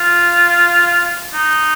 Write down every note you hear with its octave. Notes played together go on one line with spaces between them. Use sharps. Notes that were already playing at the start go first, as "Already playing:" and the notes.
Already playing: F4
D#4